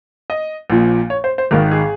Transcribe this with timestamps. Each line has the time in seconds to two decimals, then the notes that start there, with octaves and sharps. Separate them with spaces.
0.30 D#5
0.70 A#1 A#2 F3
1.10 C#5
1.24 C5
1.38 C5
1.51 G#1 G#2 D#3 A#4
1.71 G#4